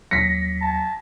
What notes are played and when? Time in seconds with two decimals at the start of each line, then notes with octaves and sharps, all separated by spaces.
0.11 D#2 F#3 A#6 B6 C#7
0.61 A5